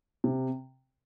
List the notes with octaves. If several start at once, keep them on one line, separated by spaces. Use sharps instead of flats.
C3